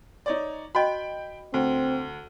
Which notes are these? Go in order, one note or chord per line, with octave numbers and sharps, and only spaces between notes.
D#4 C#5 D5
F#4 C5 D#5 G5 B5
D2 C4